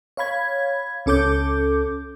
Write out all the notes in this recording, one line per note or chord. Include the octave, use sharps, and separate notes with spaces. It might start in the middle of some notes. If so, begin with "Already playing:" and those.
C#5 F5 B5 G#6
C#2 C#4 A4 D6 G6